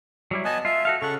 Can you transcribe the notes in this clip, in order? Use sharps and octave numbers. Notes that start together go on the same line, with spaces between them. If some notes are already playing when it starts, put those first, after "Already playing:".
F#3 G3 E4
B3 D#5 G#5 A5
F4 E5
F#4 A4 F5
C#3 A4 F#5 C#6